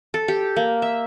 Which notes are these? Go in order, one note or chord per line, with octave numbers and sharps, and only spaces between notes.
A4
G4
A#3
E5